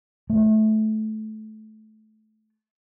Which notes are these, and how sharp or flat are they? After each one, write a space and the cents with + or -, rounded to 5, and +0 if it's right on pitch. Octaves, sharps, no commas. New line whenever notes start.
A3 -20